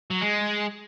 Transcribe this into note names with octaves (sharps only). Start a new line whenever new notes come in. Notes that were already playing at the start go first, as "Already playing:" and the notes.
F#3
G#3